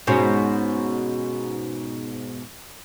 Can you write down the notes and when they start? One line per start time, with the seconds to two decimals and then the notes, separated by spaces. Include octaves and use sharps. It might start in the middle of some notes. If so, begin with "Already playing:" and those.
0.07 G#2 B2 C#4